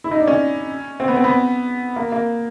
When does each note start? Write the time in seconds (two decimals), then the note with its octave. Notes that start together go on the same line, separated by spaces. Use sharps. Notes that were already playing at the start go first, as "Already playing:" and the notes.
0.04 E4
0.11 D#4
0.20 D4
0.27 C#4
1.00 C4
1.08 B3
1.17 C4
1.24 B3
1.96 A#3
2.12 A#3